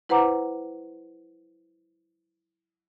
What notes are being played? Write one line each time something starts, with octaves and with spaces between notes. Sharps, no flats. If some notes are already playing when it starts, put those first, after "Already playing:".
E4 B4 C5 F#5 A#5 D6